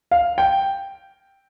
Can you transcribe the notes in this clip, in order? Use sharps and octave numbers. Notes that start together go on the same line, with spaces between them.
F5
G5